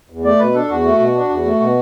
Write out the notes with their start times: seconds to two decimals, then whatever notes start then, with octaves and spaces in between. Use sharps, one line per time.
0.10 E2
0.24 A3 D5
0.39 B2 B4
0.55 D4 A4
0.69 E2 F#4
0.85 A3
0.99 B2
1.15 D4
1.29 E2
1.45 A3
1.60 B2